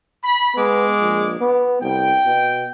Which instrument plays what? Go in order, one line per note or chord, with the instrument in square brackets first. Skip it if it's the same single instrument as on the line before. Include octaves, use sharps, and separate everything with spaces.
[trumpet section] B5
[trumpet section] G#3 D6 [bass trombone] B3
[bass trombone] A#1
B3
[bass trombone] C2 [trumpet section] G5
[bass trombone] B2